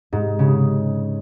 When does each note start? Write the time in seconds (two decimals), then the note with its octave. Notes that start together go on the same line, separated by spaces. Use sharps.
0.13 G#2
0.39 C#3